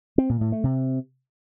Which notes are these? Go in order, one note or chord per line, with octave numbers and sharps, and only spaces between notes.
C4
A#2
A2
A3
C3